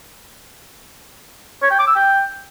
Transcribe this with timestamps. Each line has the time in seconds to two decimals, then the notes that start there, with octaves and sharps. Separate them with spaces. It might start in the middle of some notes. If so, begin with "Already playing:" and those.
1.62 C#5
1.71 G5
1.79 D6
1.87 E6
1.95 G5